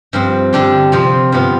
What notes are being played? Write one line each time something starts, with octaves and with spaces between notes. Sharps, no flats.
G2 F3 C4
D3 G3 D4 G4
C3 F3 C4 F4
G2 F3 B3 F4